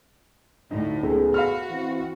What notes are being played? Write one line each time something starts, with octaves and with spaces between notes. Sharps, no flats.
D2 A2 D#4
C#2 G#3 B3 G#4 A4
F#4 F5 B5 F6
E3 C4